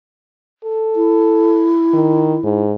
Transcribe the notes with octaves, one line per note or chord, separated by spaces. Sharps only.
A4
E4
D#3
G#2